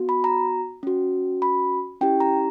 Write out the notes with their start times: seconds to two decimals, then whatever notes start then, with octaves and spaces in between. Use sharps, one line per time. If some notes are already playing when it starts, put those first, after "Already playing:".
Already playing: B3 F#4
0.09 B5
0.24 A#5
0.83 C#4 F#4
1.42 B5
2.01 C#4 E4 G4 G5
2.20 A#5